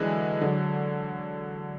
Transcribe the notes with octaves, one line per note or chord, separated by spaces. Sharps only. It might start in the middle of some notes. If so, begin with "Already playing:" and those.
Already playing: D3 E3 F#3 G#3
D3 F#3